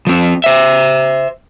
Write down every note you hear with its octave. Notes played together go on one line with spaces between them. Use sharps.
F3 C4
C5 E5